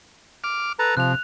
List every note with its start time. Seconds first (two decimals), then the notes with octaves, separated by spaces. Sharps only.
0.44 D6 F6
0.79 A4 B4 A#5
0.97 C3 F3 F#6 F7